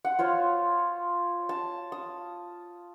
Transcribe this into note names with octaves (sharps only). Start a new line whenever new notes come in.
F#5
F4 C5 C#5 F5
A5
D#6